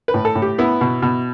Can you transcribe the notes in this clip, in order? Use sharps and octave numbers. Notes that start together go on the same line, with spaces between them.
B4
A2
A4
A2
G4
B3 E4
B2
B2